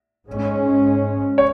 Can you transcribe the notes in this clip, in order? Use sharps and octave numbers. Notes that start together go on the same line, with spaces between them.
G#2 G#3 C#4
C#5